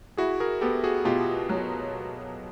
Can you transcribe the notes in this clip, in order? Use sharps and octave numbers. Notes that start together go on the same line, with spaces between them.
E4 F#4 G#4
G#4 A#4
B3 G4 A4
F#4 G#4
B2 F4 G4
F#3